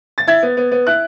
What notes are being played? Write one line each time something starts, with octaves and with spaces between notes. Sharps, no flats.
A6
E4 G#6
B3
B3
B3
E4 F#6